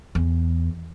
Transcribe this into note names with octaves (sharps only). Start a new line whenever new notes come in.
E2